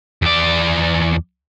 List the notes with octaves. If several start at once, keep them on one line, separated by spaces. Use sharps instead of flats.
E2 D5